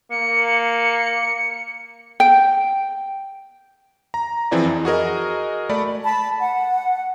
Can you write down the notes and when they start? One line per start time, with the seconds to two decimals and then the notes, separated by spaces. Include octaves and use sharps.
0.11 A#3 C#7
2.20 G5
4.14 A#5
4.51 E3 F3 C4 E4 G#4 D5
4.65 F2
4.85 F#4 G#4 A#4 D#5
5.69 A3 D5 B5
6.04 A5 B5
6.39 F#5